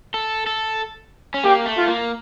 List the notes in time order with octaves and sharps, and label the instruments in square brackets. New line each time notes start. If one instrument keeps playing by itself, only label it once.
[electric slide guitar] A4
A4
C#4
[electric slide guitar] A#3 [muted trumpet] G4
[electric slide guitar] A3
[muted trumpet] F4
[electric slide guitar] A#3